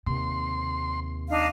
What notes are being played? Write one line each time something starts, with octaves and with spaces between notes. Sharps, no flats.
D#2 C3 C6
D4 D#4 F5